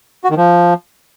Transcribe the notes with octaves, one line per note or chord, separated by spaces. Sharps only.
F#4
D#3
F3